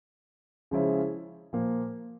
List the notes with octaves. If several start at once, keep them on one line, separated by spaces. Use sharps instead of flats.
C#3 F3 G#3 C#4 E4
A#2 F3 A#3